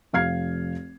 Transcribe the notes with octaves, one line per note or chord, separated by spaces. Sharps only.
F1 F5 F6 G#6 C7